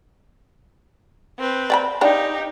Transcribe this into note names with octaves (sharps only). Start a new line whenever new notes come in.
C4 B4
D5 G5 B5
D4 D#4 G4 F5 G5